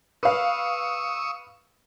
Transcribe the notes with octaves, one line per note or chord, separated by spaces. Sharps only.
B4 F5 C#6 D#6 E6